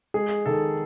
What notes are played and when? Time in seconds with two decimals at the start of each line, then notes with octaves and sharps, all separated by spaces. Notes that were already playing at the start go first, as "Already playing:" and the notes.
0.14 G#3 G#4
0.46 D#3 A4